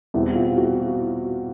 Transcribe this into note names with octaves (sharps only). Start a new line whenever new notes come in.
E2 B2 G3 C4 E4
F4
F#4